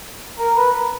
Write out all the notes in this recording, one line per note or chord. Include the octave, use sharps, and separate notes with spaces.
A#4
B4